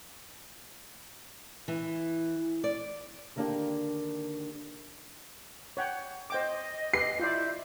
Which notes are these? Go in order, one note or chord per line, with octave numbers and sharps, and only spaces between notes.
E3
D5
D3 D#3 A#3 B3 D4 G4
C#5 F#5 G5
C5 D#5 G5 D6
G4 B4 C7
E4 F4 D5 G6